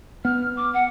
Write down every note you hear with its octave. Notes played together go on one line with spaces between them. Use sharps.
B3 F6
D6
F#5